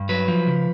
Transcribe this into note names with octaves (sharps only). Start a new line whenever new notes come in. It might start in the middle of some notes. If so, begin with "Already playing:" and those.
Already playing: G2
F#3 B4
F3
C#3